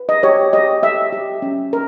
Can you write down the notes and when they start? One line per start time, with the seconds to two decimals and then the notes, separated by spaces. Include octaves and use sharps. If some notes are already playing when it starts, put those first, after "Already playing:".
Already playing: B4
0.09 D#5
0.23 G4 C#5
0.53 G4 D#5
0.83 G4 E5
1.13 G4
1.42 C#4
1.73 A#4